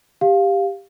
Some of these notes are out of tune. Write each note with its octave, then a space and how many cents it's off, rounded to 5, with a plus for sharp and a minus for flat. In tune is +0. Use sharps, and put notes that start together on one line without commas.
G4 +10 F5 +5